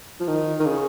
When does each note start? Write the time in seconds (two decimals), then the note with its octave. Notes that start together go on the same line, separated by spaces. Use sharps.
0.20 F3
0.27 D#3
0.60 D#3
0.66 C#3